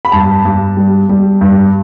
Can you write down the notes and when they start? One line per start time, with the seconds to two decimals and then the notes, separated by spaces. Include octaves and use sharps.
0.05 B5
0.12 G2 A5
0.45 G2
0.77 G3
1.09 G3
1.41 G2